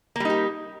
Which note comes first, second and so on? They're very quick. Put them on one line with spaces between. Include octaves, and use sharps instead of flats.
A#3 G3 D#4 G4